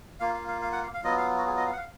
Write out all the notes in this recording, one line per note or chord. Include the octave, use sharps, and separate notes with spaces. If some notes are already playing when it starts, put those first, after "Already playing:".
A#3 F4 F5
F5
F5
F5
F#5
F5
F5
F#3 B3 F4 D#5
F5
F#4
G#4
D#5
F5
F#5
F5